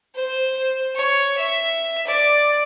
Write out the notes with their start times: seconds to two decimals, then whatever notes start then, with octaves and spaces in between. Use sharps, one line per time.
0.16 C5
0.95 C#5
1.37 E5
2.07 D5